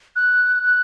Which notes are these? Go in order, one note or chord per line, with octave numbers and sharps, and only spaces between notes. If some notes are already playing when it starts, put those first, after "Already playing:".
F#6
F#6